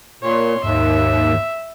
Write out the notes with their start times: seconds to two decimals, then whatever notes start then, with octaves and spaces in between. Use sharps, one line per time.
0.22 A#2 C#5 C6
0.63 D#2 G#2 E5